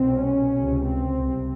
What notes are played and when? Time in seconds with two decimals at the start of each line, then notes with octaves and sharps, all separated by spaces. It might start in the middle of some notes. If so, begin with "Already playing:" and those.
Already playing: C2 B2 C4
0.22 C#4
0.53 C#2 C3
0.85 C4
1.17 C2 C3